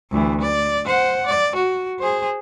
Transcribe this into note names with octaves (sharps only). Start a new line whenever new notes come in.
D2 E3
D5
C5 F#5
D5
F#4
G#4 C5